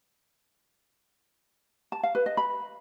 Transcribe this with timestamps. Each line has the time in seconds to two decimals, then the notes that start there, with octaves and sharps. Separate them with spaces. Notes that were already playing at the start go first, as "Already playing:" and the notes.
1.92 A5
2.03 F5
2.15 B4
2.26 D#5
2.37 B5